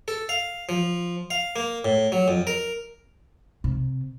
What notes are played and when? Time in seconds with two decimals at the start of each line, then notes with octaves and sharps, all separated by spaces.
0.08 A4
0.29 F5
0.69 F3
1.31 F5
1.56 A#3
1.85 A2
2.12 F#3
2.28 F2
2.47 A#4
3.64 C3